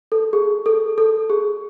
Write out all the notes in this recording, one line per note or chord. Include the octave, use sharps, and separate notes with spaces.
A4
G#4
A4
A4
G#4